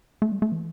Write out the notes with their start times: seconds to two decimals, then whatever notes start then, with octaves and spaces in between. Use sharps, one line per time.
0.22 A3
0.32 G3
0.42 A3
0.52 E3